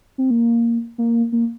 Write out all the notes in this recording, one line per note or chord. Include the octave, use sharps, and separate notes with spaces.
C4
A#3
A#3
A#3